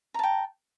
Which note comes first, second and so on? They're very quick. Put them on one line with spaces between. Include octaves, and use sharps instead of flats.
A#5 A5 G5